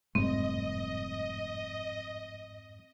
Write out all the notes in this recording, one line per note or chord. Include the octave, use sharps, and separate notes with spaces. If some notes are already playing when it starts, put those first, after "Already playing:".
F1 F2 G#2 G3 A3 C4 D#5